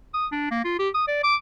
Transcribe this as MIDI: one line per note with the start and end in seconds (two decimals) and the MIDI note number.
0.14 0.27 87
0.32 0.47 62
0.51 0.62 58
0.64 0.78 65
0.79 0.89 67
0.94 1.04 87
1.08 1.21 74
1.24 1.36 86